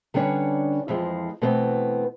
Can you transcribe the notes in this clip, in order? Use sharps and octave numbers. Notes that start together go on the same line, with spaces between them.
D3 G3 C#4 D4 B4 C#5
F2 E3 F3 G#3
B2 E3 A3 B3 C4